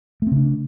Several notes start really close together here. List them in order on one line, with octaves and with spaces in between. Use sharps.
A3 C4 C#3 D4